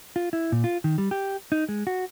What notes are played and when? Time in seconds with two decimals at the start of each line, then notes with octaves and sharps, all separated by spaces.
0.16 F4
0.33 E4
0.52 A#2
0.64 F4
0.84 D#3
0.98 G3
1.11 G4
1.52 D#4
1.69 G#3
1.87 F#4